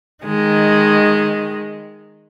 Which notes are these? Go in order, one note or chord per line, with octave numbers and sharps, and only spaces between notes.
D#3 G#3